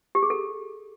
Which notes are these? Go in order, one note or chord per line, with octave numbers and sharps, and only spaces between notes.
G4
G#4
A4